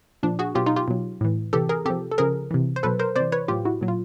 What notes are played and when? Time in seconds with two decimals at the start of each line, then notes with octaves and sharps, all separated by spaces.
0.23 A#2 F3 D4
0.39 F#4 G#4
0.55 B2 F#3 F4 G4
0.66 D#4 F4
0.76 F4 G4
0.88 B2 F#3
1.21 A2 E3
1.53 C3 E3 G4 A4
1.69 G#4 A#4
1.85 C3 F3 G4 A4
2.12 A4
2.18 C#3 F3 G#4 A#4
2.51 C3 E3
2.76 C5
2.83 B2 F#3 A4 B4
2.99 A#4 C5
3.16 C3 C5 D5
3.20 E3
3.32 B4 C#5
3.48 A2 F#3 F4 G4
3.65 E4 F#4
3.81 A#2 F#3
3.88 F4